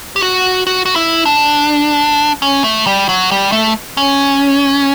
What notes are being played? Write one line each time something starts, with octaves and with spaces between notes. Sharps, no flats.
G4
F#4
F#4
F#4
E4
D4
C#4
A3
G3
F#3
G3
A3
C#4